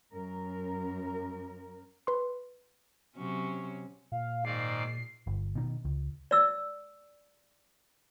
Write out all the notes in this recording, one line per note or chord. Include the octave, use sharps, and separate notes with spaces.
F#2 A#4
B4 C6
C3 F#3 C#4
A#2 F5
G#2 D#3 D5 C7
G1
B2 D#3
C#2
D5 E6